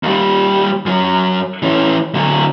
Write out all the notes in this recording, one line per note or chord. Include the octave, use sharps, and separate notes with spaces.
D#2 G3
F#2 F#3
E3 C#4
D3 F#3